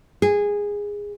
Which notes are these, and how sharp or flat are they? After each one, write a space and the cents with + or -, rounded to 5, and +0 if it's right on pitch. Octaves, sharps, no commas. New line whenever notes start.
G#4 -15